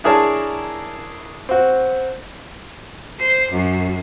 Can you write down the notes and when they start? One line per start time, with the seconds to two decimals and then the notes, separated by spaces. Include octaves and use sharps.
0.04 D4 E4 G#4 A#4 C#5 A5
1.49 C4 F#4
3.18 C5
3.50 F#2